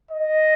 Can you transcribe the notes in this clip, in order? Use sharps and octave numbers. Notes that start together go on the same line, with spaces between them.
D#5